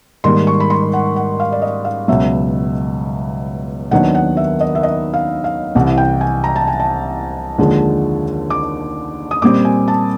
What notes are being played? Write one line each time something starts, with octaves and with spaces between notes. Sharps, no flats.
G#2 D#3 G3 A#3 C6
C#6
B5
C6
F#5
F#5
F5
D5
D#5
F5
C#2 B2 F#3 E5
D#2 D#3 F#3 B3 D4 F#5
F#5
E5
D#5
E5
D#5
F5
F5
C2 C3 E3 F#5
G5
G#5
A#5
A5
G#5
A5
D#2 D3 F3 G#3
D6
D#6
A#2 G3 C4 D6
G#5
A5